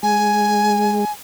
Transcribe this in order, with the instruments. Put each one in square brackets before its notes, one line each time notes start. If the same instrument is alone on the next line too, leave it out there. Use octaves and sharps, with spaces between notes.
[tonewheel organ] G#3 [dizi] G#5